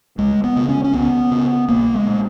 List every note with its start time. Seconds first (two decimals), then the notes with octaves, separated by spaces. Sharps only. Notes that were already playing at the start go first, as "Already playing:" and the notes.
0.18 C#2 G#3
0.44 B3
0.56 C#3
0.69 C#4
0.84 C#4
0.93 C#2 B3
1.31 C#3
1.69 B1 A#3
1.94 G#3
2.06 A#2